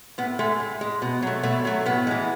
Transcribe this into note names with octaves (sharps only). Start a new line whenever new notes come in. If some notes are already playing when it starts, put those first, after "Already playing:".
A2 B3
G#3 A3
A2
G#3
B2
F#3 A3
B2 A3
F#3 A3
A2 B3
E3 G#3